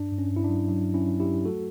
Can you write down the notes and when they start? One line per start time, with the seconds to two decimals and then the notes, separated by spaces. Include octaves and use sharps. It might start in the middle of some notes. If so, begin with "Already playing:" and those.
Already playing: G2 D4
0.12 G2
0.18 C#4
0.32 G2 E4
0.44 D4
0.49 F#3
0.68 F#3 D4
0.88 G2
0.94 C#4 E4
1.06 F#3
1.20 E4 G4
1.26 F#3
1.45 A3 F#4 A4